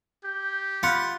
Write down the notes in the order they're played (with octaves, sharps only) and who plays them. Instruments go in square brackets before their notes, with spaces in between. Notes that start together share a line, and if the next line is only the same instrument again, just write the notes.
[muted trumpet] G4 [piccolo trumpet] G6
[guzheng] F4 [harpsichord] F#5 [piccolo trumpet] B5